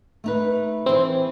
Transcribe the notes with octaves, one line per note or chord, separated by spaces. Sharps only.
A3 D#4 B4
E3 C4 G#4